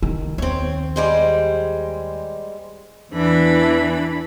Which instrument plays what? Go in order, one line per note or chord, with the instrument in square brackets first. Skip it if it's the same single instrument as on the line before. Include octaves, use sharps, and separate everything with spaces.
[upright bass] D#3
[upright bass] D#2 [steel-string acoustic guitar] C4 C#5
[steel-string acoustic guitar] G3 G#3 C5
[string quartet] E2 E3 D4 B5